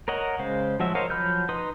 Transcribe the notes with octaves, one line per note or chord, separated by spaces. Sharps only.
A#4 C#5 D#5 F#5
C#3 G#3 C5 F5
F3 F#3 G#3 F#4 E5
A#4 C5 C#5 D#5 F5
F3 F#3 B5 F6 G6
D#4 B4 C6 D#6